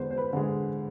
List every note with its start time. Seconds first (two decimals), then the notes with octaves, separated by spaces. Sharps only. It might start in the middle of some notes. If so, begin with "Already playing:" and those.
Already playing: E2 D3 G#3 B4 C5
0.10 C5
0.18 B4
0.33 D3 G#3